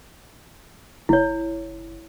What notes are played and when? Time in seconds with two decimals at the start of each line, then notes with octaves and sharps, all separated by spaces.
1.09 F#1 E4 C#5